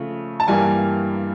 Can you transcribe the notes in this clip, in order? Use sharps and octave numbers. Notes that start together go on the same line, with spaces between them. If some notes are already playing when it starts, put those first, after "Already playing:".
Already playing: C#3 F3 A3
A5
G2 E3 G3 A#3 G#5